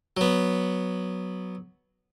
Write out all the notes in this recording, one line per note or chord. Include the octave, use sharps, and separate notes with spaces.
F#3 B3